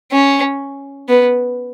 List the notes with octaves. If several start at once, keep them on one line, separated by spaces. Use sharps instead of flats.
C#4
B3